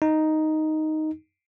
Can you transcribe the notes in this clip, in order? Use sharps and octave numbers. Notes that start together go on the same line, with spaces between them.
D#4